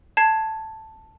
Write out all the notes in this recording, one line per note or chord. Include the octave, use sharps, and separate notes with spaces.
A5 G#6 C7